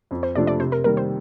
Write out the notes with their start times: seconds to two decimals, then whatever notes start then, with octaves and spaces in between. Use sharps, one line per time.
0.11 F2
0.23 C5
0.35 C3 F3 A3 D4 D5
0.47 D5
0.59 C3 C5
0.72 A#4
0.84 D#3 G3 A#3 A#4
0.97 C5